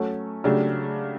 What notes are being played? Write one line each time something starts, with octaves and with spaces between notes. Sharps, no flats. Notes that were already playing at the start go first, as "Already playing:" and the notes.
Already playing: F#3 A3 C#4 F#4 A4
C#3 F#3 A3 D4 G4